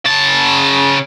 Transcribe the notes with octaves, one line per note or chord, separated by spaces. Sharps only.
C#3 A5